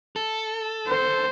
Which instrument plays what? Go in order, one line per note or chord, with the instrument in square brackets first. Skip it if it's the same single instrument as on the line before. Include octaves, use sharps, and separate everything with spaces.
[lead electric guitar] A4
[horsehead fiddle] C5